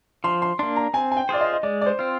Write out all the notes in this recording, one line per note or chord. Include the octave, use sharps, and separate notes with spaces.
F3 C6
C6
A#3 D4 C6
A#5
C4 G#5
G#5
G5
F4 G#4 C5 D5
D#5
D#5
G#3 D5
D5
C5
C4 F4